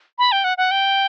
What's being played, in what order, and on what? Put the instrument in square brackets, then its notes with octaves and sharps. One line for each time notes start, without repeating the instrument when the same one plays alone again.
[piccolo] B5
G5
F#5
F#5
G5